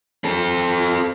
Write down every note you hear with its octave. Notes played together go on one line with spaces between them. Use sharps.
C4 A4